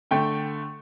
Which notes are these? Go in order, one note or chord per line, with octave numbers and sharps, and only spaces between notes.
D3 A3 G5